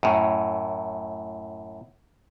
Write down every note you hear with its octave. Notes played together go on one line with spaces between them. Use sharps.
F#2 A2